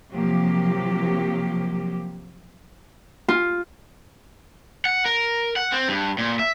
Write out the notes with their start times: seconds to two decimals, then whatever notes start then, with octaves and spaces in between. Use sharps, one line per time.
0.13 C3 F3 F#3 A#3 G4
3.28 F4
4.85 F#5
5.06 A#4
5.56 F#5
5.72 C4
5.88 G2
6.18 A#2
6.39 E5